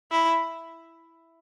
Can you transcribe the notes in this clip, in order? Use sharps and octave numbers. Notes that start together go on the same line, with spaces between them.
E4